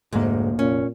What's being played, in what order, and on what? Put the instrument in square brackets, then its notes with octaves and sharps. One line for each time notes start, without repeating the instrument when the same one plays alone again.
[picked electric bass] F1 A#3 [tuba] D2 [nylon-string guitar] G#2
[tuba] A#2 [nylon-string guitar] C#4